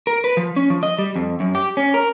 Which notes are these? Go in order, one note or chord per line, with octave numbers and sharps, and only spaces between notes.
A#4
B4
F3
C#4
F3
D#5
G3
F2
F#2
G4
C#4
A#4